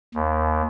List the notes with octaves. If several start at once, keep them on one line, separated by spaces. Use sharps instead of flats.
D#2